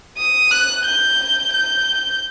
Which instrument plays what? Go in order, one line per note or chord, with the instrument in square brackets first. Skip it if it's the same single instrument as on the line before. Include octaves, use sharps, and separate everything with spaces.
[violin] D#6
F#6
G6
G6